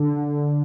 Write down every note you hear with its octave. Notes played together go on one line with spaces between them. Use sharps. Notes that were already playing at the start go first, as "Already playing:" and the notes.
Already playing: D3